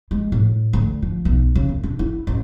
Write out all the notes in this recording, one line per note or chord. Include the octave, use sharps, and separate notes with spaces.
G#3
A2
D2
F3
B1
C#3
C2
D4
E4
A1